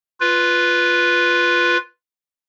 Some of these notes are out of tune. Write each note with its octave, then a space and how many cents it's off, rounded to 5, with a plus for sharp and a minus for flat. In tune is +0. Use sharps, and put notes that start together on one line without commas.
F4 +0 B4 +0